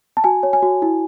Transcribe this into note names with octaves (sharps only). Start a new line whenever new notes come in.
A5
F#4 G#5
C#5
G#5
F#4
E4